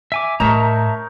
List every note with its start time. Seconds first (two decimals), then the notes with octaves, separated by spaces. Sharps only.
0.12 E5 G#5 D6
0.40 A2 D#4 A#4 C#5 E5 A5 A#5